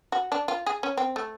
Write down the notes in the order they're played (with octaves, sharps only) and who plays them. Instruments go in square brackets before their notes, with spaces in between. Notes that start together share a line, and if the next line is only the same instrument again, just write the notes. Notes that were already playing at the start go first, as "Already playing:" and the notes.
[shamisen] F#4
D4
F4
G#4
C#4
C4
A3